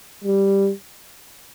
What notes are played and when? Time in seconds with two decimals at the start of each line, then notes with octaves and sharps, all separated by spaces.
0.24 G3